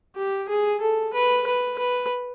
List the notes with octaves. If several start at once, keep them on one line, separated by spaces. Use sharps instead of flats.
G4
G#4
A4
B4
B4
B4